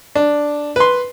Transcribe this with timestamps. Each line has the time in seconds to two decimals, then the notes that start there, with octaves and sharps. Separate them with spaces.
0.15 D4
0.76 B4 C6